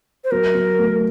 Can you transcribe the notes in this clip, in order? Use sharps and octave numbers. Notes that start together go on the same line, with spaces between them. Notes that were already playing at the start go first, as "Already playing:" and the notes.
C5
F#3 A#4
F#3
A3